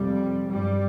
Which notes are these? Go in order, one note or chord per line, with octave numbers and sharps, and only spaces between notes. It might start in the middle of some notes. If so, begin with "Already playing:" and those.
Already playing: F2 C3 G3
G2 G3